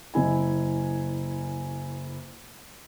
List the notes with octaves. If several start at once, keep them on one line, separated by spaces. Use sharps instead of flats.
F#1 E4 G#5